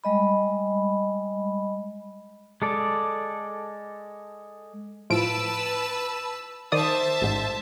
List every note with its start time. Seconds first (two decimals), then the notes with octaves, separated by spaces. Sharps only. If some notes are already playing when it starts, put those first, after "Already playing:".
0.04 G3 G#3 D#5 B5
2.62 G#3 A4 D5
5.10 A2 F3 B4 A5 E6 D7
6.72 D#3 C5 D5 E5 A5 D#6
7.21 A1 G#2